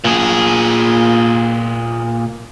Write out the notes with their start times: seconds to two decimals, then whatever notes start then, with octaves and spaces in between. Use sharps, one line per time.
0.04 A#2 G#4